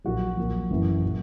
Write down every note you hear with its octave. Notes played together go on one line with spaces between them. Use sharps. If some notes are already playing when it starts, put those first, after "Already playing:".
A#1 A#2 F#3 F#4
A#1 A#2 F#3
F#1 F#2 E3
A#2 F#3